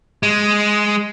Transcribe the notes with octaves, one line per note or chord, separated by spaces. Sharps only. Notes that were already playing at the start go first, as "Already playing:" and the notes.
G#3